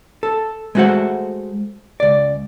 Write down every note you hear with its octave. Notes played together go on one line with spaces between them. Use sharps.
A4
G#3 A3 B3 F#4 C5 F#5
C#2 D5